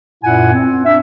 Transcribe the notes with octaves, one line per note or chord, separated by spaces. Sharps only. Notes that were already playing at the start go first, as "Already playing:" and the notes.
F#2 A#2 E4 F4 F#5 G#5
C4
D4 E5